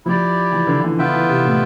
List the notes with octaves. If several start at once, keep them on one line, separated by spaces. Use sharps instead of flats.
F3 E4 G4 D5
E3
D3
E3
D3 B3 F4 B4 E5 G5
E3
C3
A2